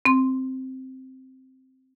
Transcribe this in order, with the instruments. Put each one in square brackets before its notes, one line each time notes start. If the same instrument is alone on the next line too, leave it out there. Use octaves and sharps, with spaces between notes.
[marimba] C4 C6